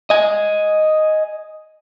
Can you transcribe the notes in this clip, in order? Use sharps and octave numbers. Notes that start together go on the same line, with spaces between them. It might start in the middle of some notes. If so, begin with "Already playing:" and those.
D#5 G#5